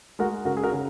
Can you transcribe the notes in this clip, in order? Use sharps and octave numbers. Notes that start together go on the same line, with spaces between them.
G#3 F#4 A#4
C#3 F#4 A#4
G#4
F#4 A#4
C#3